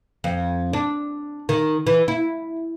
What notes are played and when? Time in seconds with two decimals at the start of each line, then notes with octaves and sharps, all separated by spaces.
0.24 F2
0.73 D4
1.49 D#3
1.87 E3
2.08 E4